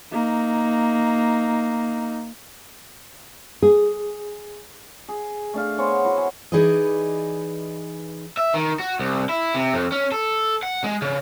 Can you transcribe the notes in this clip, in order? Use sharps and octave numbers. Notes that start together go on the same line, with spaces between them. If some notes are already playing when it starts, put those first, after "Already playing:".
A#3 D#4
G#4
G#4
A3 D4 F5
B3 C5 C#5 G#5
E4 F#4
G#4
E3 D#4 G#4 B4 D5 D#5
E5
D#3
F#4
C2
E4
C3
F2
C#4
A4
F#5
G#3
C#3